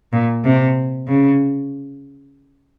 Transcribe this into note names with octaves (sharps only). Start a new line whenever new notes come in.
A#2
C3
C#3